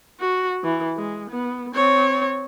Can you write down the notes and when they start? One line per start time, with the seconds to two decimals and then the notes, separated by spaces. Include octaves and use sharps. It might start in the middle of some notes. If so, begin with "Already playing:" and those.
0.20 F#4
0.64 E3
0.96 G#3
1.30 B3
1.74 C4 C#5